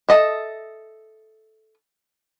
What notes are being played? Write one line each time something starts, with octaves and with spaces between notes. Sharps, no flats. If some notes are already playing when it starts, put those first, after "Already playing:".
A4 D#5 E5